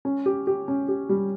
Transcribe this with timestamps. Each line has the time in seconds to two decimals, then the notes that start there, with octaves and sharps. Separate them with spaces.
0.05 C#4
0.26 G4
0.47 G4
0.68 C#4
0.88 G4
1.09 G3